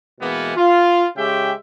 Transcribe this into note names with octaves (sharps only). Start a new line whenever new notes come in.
B2 E3 G#3 A#3 B3
F4
C#3 G#3 G4 E5 G5